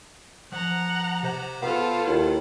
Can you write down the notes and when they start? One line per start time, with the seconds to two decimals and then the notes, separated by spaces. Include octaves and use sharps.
0.52 F3 F#5 A#5
1.23 C3 C5
1.62 B3 F4 A4 C5 F5
2.07 D#2 E4